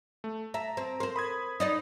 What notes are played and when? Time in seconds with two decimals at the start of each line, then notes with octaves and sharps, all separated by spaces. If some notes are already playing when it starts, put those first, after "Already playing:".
0.24 A3
0.54 E5 A5 A#5
0.77 C4
1.00 A#4 C5 C6
1.16 B5 D#6 G#6
1.60 D#4 D5 D#5